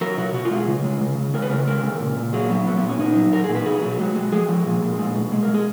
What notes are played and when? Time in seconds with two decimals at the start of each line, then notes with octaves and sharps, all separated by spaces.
0.01 F#3 A#4
0.18 B2 F#4
0.34 B2 F#4
0.45 F4
0.51 G#3
0.56 G#4
0.68 C#3
0.84 G#3
1.01 C#3
1.17 C#3
1.34 G#3 A#4
1.42 B4
1.50 C#3 A#4
1.67 G#3 A#4
1.83 C#3
2.00 A#2
2.16 A#2
2.33 F#3 G#4
2.49 F#3 B3
2.67 A#2 B3
2.77 B3
2.83 A#2
2.89 C#4
3.00 A#2 D#4
3.16 F#3
3.33 A#2 A#4
3.44 G#4
3.50 A#2
3.55 B4
3.66 B2 G#4
3.83 F#3
3.99 G#3 F#4
4.16 G#3
4.32 F3 G#4
4.49 F3
4.66 A#2
4.82 A#2
4.99 G#3
5.15 B2
5.32 G#3
5.43 A#4
5.48 G#3
5.54 G#4